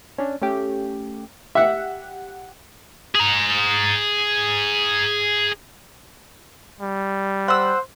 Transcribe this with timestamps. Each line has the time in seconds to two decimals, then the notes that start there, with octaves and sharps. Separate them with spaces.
0.18 C#4 D4
0.42 A3 C#4 G4
1.55 G4 E5 F#5
3.15 G#4 A#5
6.81 G3
7.48 C5 F#5 E6